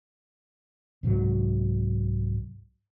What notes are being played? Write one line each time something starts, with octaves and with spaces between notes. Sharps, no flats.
C2 G#2 F#3